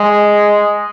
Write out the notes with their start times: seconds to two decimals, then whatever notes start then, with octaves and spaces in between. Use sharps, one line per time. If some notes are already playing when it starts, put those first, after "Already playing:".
Already playing: G#3